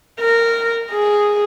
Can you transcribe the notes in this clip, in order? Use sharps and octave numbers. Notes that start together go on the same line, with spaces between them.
A#4
G#4